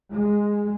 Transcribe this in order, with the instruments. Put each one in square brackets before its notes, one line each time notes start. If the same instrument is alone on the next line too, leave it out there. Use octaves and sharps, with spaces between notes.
[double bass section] G#3